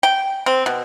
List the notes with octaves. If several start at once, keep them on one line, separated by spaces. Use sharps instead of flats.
G5
C4
B2